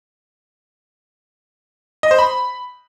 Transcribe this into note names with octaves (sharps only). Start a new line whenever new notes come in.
D#5
C5
B5